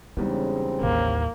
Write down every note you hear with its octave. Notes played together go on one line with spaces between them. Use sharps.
E2 C#3 G3 G#3 C4 D#4
A1 D#2 A#3